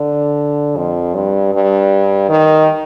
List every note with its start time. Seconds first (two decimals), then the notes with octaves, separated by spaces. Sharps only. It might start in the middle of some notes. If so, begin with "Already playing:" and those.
Already playing: D3
0.76 F2
1.15 G2
1.53 G2
2.29 D#3